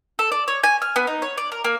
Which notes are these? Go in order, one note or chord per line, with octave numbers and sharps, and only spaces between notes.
A4
D5
C#5
G#5
F6
B3
D#4
C#5
D5
A#4
A#3